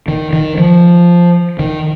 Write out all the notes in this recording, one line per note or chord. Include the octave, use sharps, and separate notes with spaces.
D#3
D#3
F3
D#3